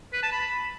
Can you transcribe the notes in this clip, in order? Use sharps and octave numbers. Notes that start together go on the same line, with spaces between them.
B4
A5
B5